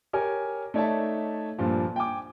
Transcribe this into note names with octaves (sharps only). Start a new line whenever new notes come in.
G4 A#4 C#5 G#5
A3 D#4 C#5 D5 E5 A5
G2 A#2 F3
G5 G#5 D6